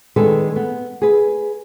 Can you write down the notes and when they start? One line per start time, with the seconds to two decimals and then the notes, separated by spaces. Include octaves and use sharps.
0.16 D#3 G#3 D4 A4 B4
0.56 B3
1.02 G#4 B4